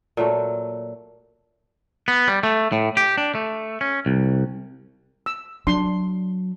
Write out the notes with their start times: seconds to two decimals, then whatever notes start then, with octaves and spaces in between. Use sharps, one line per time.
0.17 A#2 F#3 A3
2.08 B3
2.28 G3
2.43 A3
2.72 A2
2.97 G4
3.18 D4
3.35 A3
3.81 C#4
4.06 C2
5.26 E6
5.67 F#3 D4 C6